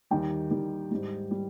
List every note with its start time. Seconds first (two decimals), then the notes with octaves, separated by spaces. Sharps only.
0.11 D#2 D#3 G3 G5
0.50 D#2 D#3 G3
0.91 G#2 G3
1.31 G3